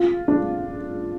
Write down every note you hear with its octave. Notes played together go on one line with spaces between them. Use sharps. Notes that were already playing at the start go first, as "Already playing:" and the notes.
Already playing: F4
D4